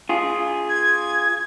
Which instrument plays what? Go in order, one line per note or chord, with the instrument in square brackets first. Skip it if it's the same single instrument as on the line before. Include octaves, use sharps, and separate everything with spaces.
[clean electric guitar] F4 G#4
[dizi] G#6